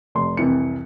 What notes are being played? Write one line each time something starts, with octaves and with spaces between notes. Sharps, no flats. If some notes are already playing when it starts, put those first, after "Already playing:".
F1 C6
C2 F2 E3 C#7